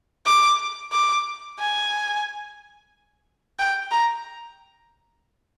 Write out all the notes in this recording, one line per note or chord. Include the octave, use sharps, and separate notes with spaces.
D6
D6
G#5
G5
A#5